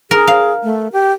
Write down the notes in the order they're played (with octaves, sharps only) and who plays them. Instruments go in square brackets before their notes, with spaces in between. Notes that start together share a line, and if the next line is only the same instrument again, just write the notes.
[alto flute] G#4 [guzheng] A#4
[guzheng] F5
[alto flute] A3
G4